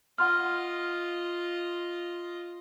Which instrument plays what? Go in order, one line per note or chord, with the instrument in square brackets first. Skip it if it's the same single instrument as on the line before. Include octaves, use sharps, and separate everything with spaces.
[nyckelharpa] F4 D#5 [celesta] F#5 C6 F6